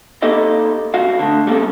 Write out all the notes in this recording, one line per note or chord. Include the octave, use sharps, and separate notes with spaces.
A#3 D#4 G4 A4 D#5
B1 F#4 F5
D3 A3
G3 A#3 C#4 A4